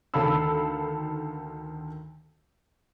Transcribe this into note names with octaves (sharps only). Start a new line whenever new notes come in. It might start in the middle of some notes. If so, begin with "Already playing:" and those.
D2 D#3 A4 F5 B5 E6